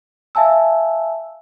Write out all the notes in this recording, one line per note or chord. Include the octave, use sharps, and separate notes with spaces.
E5 F5 G#5 A5 E6